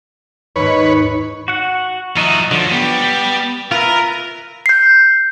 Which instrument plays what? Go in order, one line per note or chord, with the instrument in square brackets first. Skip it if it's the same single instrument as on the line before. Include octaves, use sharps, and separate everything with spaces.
[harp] D#2 G#2 [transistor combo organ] B4 C#5
[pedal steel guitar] F#4 F#5
[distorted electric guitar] F3 F#4 [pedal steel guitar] D#4 D#5 E5
[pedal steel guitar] D3 [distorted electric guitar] F3 F#3
[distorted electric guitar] G3 [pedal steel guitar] B3
[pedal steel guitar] F4 B4 E5 [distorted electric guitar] A#4
[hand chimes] G6 C7